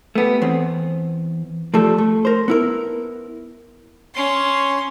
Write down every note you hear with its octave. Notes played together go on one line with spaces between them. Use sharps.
A3 B3 G4
E2 C4
F3 G3 A3 A4
A3
A#4 C5
B3 E4 A#4
C#4 C6